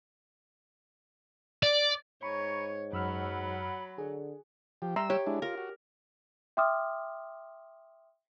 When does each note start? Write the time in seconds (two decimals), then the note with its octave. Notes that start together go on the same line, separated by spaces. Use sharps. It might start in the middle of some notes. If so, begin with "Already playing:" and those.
1.63 D5
2.23 G#2 C#5 G#5 A#5 B5 C#6
2.93 F#2 F#3 F#5 B5 E6 F6
3.98 D3 G#4
4.82 F3 G4
4.96 G3 E5 A#5 C6 E6
5.10 G4 C#5
5.26 G#3 D4 E4
5.42 F4 A#4
5.58 F#4
6.57 E5 G5 C6 D6 D#6 F6